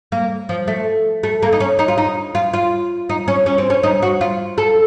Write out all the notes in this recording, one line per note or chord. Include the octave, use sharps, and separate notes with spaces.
A#3
F3
A3
A3
A#3
D#4
C#4
D#4
F4
D#4
F4
F4
D#4
C#4
C#4
C4
C#4
D#4
F#4
F4
A4